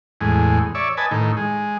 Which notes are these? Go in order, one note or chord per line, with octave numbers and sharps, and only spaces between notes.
E2 A2 G#3
C#5 D5 E5
B4 D#5 G#5 A5
A2 D#3
G#3